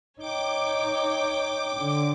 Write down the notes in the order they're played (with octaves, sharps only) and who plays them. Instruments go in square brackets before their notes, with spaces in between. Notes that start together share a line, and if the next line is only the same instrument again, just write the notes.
[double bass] D#4 [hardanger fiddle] C#5 G5 [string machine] D6
[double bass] D3